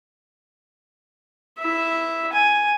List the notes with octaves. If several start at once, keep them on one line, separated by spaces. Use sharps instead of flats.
E4 E5
G#5